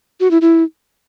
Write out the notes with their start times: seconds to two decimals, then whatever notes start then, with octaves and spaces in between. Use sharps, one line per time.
0.20 F#4
0.31 E4
0.41 E4